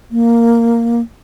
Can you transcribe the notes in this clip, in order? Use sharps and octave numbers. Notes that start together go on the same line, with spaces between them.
A#3